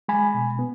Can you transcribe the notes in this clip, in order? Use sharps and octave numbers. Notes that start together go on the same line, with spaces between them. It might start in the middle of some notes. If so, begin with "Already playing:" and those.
G#3 G#5 B5
B2
B3